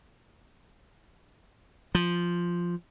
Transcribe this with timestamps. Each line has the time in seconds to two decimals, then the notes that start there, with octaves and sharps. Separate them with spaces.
1.95 F3